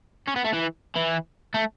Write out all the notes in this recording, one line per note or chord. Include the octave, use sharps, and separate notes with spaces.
C#4
B3
A3
E3
E3
A3